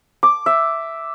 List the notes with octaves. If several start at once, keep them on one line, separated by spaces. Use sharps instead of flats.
D6
E5